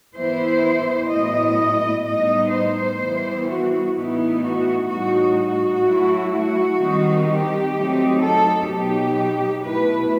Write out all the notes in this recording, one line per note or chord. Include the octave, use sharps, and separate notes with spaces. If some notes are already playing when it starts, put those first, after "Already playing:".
E3 B3 E4 C5
A2 F#3 B3 E4 D#5
A2 G3 B3 D#4 D#5
C5
E3 G3 B3 E4
F#4
A2 E3 B3 D#4 E4
F#4
A2 G3 D#4 F#4
F#4
F#3 A3 E4
F#4
D#3 G3 C4 D#4
G4
F#3 A3 C4 D#4
A4
B2 F#3 B3 D#4 G4
B2 A3 E4 B4